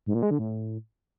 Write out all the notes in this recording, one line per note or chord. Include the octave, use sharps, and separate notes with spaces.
G#2
A#2
G#3
D3
A2